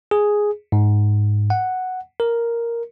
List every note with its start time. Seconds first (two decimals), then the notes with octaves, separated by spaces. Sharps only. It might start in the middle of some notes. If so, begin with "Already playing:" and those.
0.11 G#4
0.72 G#2
1.50 F#5
2.20 A#4